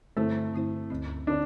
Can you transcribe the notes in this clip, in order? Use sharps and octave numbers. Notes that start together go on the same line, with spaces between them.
G2 D3 A3 C4 E4 C5
G2 D3 C4 E4 C5
D2 D3 C4
D3 C4 D4